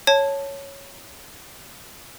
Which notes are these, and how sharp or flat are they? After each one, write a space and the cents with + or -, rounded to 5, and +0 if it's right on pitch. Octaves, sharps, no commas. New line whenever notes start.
C#5 +0 A5 +0